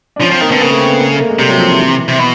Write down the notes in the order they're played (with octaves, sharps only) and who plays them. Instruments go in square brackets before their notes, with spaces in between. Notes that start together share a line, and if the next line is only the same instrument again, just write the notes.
[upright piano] D4
[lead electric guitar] F3 [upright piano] C#4
[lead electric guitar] F3 [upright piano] C4
[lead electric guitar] D#3 [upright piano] A#3
[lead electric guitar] D3 [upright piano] B3
[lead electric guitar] C#3 [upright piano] A#3
[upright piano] A3
C4
B3
A#3
A3
A#3
G#3
[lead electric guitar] C3 [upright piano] G3
[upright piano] F#3
F3
E3
E3
[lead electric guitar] C3
B2